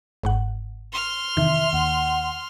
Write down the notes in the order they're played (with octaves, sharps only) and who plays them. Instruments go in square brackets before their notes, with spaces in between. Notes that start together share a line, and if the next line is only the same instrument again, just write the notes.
[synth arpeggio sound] G1 G#2 F#5
[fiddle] C6 F6
[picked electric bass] F1 C3 E3 [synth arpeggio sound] D#3 [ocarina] E5
[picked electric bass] D#2 [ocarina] F#5